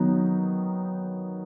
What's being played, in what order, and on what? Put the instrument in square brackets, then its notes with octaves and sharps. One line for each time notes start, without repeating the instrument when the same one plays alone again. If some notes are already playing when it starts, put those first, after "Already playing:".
Already playing: [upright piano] D#3 F#3 B3 D#4